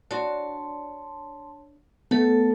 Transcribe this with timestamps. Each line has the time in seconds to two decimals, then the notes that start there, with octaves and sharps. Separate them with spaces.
0.11 D4 F#4 C#5 A5 C6
2.11 A3 B3 A4 C#5 A5